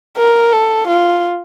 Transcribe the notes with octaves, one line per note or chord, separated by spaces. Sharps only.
A#4
A4
F4